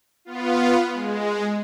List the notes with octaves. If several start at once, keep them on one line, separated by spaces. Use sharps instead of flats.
B3 F4
G#3